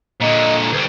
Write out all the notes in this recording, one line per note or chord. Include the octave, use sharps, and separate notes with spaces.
A#2 D3 D#5
D2 G3 B4